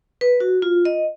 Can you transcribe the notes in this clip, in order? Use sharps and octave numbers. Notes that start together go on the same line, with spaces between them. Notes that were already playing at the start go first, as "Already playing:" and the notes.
B4
F#4
F4
D#5